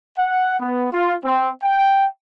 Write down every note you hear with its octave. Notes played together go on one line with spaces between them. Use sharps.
F#5
B3
F4
C4
G5